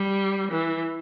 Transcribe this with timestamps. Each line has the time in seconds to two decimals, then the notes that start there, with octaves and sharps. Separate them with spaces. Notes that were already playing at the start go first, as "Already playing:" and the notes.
Already playing: G3
0.50 E3